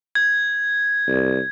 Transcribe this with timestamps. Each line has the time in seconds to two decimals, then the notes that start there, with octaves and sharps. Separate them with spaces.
0.15 G#6
1.08 C2